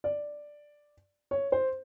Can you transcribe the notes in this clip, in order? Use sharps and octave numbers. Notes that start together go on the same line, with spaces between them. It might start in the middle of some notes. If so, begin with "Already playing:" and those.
D5
C#5
C5